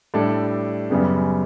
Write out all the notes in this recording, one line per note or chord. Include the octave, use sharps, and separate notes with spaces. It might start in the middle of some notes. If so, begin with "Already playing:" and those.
A2 G3 D4 A4
F#2 C#3 G3 B3